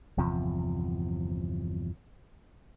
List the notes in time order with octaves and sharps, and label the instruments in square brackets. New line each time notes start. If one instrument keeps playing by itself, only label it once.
[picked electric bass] G1 E2 C3 F3